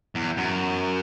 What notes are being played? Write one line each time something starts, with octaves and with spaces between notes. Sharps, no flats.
E2
F#2